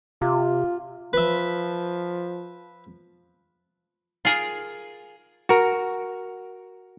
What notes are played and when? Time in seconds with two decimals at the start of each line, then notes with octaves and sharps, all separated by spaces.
0.22 C3 F4
1.13 F3 B4 E5
4.25 F4 G#4 A#4
5.49 F#4 A#4